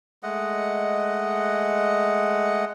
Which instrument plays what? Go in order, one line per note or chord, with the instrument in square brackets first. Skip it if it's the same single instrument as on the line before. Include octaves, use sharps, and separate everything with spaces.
[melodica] G#3 A3 D#5 F#5